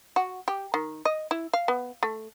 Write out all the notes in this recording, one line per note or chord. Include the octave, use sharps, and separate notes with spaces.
F#4
G4
D#3
D#5
E4
F5
B3
A3